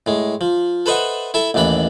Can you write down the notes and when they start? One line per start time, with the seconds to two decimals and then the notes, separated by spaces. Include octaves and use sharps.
0.06 A2 G#3
0.41 F3
0.86 A4 B4 C5 D#5 E5 F#5
1.34 E4 A4 E5
1.54 A1 D#2 E3 D4 B5